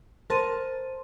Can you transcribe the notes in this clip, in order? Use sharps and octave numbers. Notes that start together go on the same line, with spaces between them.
A#4 C5 A5 C6 D#7